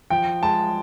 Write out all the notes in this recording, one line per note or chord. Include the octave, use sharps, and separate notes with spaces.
F3 G5
G#3 A5